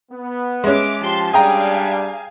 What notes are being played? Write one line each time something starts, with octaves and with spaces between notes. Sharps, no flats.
B3
G#3 C#4 E5 D6
F3 G4 A5 C6
G3 D4 G#4 F5 G5 G#5 A#5